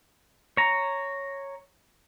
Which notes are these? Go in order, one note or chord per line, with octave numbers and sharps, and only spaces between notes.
C#5 A#5